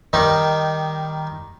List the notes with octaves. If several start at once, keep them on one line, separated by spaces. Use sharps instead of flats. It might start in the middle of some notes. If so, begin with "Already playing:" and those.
D#3 G3 D#4